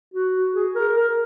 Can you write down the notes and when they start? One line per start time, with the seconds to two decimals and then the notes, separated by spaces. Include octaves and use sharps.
0.14 F#4
0.54 G#4
0.75 A#4
0.94 A#4